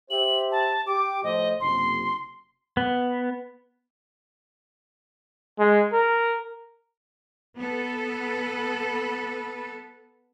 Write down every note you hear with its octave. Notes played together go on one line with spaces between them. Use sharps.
G4 C5 E5 F#7
A5
G4 G5 D6
A2 F3 C5 D#5
F#1 C3 C6
B3
G#3
A#4
B3 A4 B4